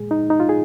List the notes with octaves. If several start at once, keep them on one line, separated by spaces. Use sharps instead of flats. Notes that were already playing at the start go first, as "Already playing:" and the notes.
Already playing: A#2 G#3 G#4
D#4
D#4
F4
G#4